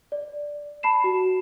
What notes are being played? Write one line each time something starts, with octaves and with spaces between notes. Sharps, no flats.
D5
A5 B5 C7 E7
F#4